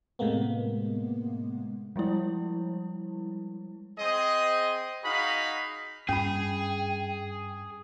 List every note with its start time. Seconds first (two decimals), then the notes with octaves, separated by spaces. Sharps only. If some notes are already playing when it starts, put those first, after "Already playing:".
0.19 A2 C3 G#3 A#3 B3
1.96 F3 G3 G#3 E4
3.98 C4 G#4 C5 D#5
5.03 D#4 F#4 G#4 F5 B5
6.09 G2 C#4 G#4 G5 B5